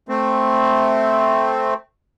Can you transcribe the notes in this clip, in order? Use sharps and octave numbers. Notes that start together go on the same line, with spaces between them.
A3 C4